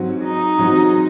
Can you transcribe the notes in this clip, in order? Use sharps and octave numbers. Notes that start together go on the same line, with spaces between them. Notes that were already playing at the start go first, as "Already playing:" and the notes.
Already playing: G#2 F#3 C4 F#4
D#4
G#2 F#3 C4 F#4